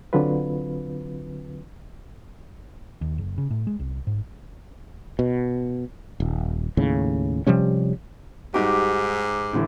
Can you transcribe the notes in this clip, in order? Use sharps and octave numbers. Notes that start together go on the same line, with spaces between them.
D3 F#3 C4 F4 B4
D#2
F#1
C#3
A2
G#3
C2
G#2
B2
D#1
D#2 A2 C#3
C3 F3 G3 C#4
G#2 G3 D#4 F#4 G4
A2 D3 E3